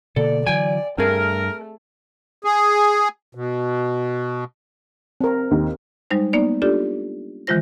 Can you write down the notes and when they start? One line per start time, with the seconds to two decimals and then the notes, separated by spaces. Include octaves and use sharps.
0.16 B2 D3 A#3 A4 D5
0.46 D3 E3 F#3 D5 G5 G#5
0.98 G2 A3 C4 G#4 A#4
2.44 G#4
3.35 B2
5.21 C4 A#4
5.51 D#2
6.11 G3 G#3 D#4 C5
6.33 A#3 B3 D#4 D5
6.62 D4 F4 G4 A4 D5
7.47 D#3 E3 G#3 F4 C5 A#6